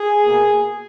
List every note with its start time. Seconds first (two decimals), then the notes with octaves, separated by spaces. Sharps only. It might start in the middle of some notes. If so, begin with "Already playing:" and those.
Already playing: G#4
0.24 B2 A#3